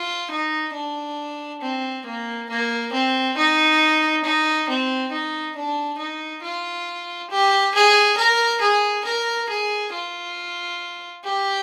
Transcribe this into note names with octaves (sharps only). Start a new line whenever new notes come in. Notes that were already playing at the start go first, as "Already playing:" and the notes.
Already playing: F4
D#4
D4
C4
A#3
A#3
C4
D#4
D#4
C4
D#4
D4
D#4
F4
G4
G#4
A#4
G#4
A#4
G#4
F4
G4